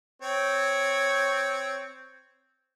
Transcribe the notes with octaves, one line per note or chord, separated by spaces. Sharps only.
C4 C#5